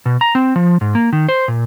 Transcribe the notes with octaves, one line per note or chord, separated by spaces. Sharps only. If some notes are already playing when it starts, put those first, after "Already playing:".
B2
A#5
C4
F3
G#2
A#3
D#3
C5
A#2